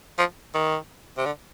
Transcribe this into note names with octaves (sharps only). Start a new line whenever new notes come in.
F3
D#3
C3
D3